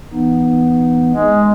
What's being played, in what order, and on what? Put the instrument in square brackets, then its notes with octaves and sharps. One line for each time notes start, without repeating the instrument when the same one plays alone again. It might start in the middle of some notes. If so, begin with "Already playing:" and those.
[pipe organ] E3 B3 D#4
[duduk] G#3